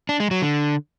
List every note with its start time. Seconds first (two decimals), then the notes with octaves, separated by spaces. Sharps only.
0.09 D4
0.20 G#3
0.31 F#3
0.42 D3